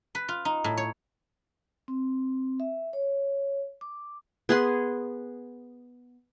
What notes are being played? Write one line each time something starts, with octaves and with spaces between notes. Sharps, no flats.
B4
F4
D#4
A2
C#5
C4
E5
C#5
D6
B3 G#4 F#5 C6